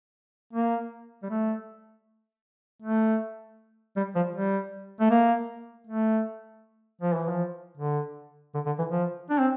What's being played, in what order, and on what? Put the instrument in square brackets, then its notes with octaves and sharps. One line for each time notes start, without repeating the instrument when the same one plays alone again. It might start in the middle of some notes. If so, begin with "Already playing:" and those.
[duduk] A#3
G3
A3
A3
G3
F3
G3
A3
A#3
A3
F3
E3
F3
D3
D3
D3
E3
F3
D4
C4